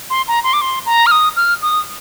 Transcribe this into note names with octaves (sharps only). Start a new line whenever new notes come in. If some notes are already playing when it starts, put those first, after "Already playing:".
C6
A#5
C6
D6
C6
A#5
F6
D#6
F6
D#6